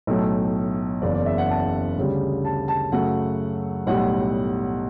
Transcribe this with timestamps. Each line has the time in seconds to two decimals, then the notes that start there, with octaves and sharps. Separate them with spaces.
0.07 B1 A2 F#3 A3
1.02 F#1 E2 C#3 D5
1.14 D5
1.26 E5
1.38 F#5
1.50 A5
1.98 D2 C#3 G3
2.45 A5
2.68 A5
2.92 F#2 C#3 F#3 A3 F#5
3.87 B1 A2 G3 F#5